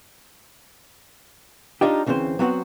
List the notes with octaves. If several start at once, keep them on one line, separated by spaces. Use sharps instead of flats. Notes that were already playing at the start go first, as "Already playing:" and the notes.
D4 D#4 F4 G4
D2 C#3 E3 C4 C5
F#3 B3 C4 F#4 F#5